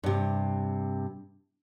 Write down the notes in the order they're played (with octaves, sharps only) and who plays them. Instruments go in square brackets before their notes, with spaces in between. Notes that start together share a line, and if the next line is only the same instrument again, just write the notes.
[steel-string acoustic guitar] G2 C3